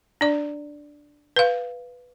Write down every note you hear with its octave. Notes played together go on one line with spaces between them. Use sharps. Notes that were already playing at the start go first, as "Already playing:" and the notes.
D4 D5
B4 F5